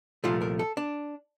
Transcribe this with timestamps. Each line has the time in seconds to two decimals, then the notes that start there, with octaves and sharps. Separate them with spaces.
0.24 C2 A#2 F3 A3 F4
0.42 A#4
0.59 A4
0.77 D4